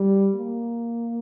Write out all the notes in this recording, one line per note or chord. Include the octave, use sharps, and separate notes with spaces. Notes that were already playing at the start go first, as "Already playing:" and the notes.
Already playing: G3
A#3